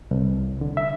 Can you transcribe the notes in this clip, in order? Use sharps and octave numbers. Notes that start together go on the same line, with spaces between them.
C2
D3
E5